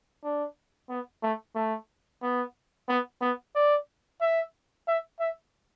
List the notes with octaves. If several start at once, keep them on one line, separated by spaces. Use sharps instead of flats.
D4
B3
A3
A3
B3
B3
B3
D5
E5
E5
E5